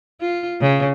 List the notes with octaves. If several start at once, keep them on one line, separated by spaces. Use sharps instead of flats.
F4
C#3